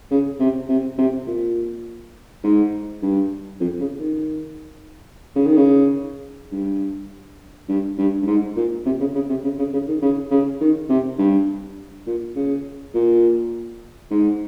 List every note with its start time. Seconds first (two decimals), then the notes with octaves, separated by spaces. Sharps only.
0.11 C#3
0.40 C3
0.69 C3
0.98 C3
1.27 A#2
2.44 G#2
3.02 G2
3.60 F2
3.80 C#3
4.00 D#3
5.36 C#3
5.46 D#3
5.57 C#3
6.52 G2
7.69 G2
7.98 G2
8.22 G2
8.27 G#2
8.56 A#2
8.86 C3
9.00 C#3
9.15 C#3
9.29 C3
9.44 C#3
9.58 C#3
9.73 C#3
9.87 D#3
10.02 C#3
10.31 C#3
10.61 D#3
10.89 C3
11.19 G2
12.06 A#2
12.35 C#3
12.94 A#2
14.11 G#2